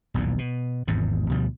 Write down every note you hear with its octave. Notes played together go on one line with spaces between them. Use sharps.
D#1 B1 E2 A#2
B2
G#1 E2 G#2 C3
D2 B2 F3 G3